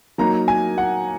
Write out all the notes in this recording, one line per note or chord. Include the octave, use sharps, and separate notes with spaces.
F#3 A#3 D#4 A#5
G#5
F#5